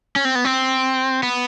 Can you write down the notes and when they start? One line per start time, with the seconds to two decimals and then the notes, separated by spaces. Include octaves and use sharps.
0.16 C#4
0.25 C4
0.35 B3
0.45 C4
1.23 B3